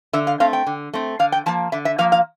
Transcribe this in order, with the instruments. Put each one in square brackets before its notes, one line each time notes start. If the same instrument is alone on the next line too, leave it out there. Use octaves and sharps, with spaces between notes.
[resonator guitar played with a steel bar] D3 E5
F5
A3 C4 F5
G5
D3
A3 C4
D3 F5
G5
F3 A#3 A5
D3 E5
E5
F3 A#3 F5
F5